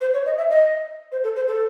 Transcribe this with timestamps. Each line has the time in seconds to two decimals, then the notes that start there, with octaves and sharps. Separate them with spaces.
0.01 C5
0.14 C#5
0.26 D#5
0.38 E5
0.50 D#5
1.12 C5
1.24 A4
1.36 C5
1.48 A4